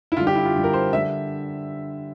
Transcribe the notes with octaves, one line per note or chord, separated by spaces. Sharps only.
E4
D3 G3 F4
G4
E4
F4
D3 G3
A#4
C5
D3 G3 E5